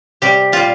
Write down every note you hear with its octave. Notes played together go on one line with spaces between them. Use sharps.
C3 G3 G4
A#2 G3 F4